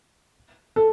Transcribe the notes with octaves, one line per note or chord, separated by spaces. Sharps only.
A4